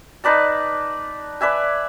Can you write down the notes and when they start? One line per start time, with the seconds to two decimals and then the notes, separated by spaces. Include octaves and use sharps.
0.24 D#4 B4 D5 A5
1.41 B4 D5 E5 G#5